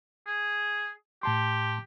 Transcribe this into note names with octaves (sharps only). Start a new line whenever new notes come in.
G#4
A2 G4 A5 C6